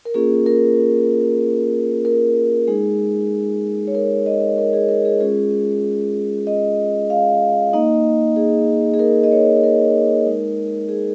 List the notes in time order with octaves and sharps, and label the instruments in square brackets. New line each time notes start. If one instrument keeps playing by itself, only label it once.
[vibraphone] A#4
A#3 C#4 F4 G#4
A#4
A#4
G#3 D#4 G#4
C#5
A#4
D#5
A#4
G#4
A#4
G#4
G#3 C#4 F4 G#4
D#5
F5
A#3 D#4 D#5
G#4
G#4
A#4
D#5
C#5
A#4
G#3 D#4
G#4